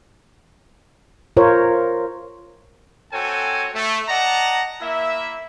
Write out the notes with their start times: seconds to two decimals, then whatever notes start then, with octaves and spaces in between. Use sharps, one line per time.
1.37 F4 A#4 C5 C#5
3.12 C4 F#4 A4 C#5 G5 G#5
3.75 A3
4.08 D5 D#5 F#5 A5 A#5
4.81 A#3 E4 E5